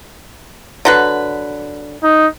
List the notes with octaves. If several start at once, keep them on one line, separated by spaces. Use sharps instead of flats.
D3 F#3 B4
D#4